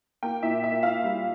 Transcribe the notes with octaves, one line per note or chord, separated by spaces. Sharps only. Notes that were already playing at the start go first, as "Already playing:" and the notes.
A#3 G5
A#2 E5
A#3 E5
A#3 F5
G3